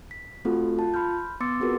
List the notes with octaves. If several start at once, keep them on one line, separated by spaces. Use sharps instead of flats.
B6
A3 C4 F4 F#4 A4
F4 A5
B5 C6 F6 G6
B3 C6 D6 E6 A6 C#7
C4 F4 F#4 G#4 A#4 B4